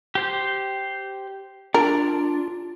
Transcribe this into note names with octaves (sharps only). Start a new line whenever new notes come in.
G4 C5 G6
D4 F4 A#4